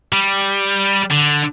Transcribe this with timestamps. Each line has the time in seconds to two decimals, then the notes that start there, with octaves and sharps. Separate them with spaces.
0.13 G3
1.11 D3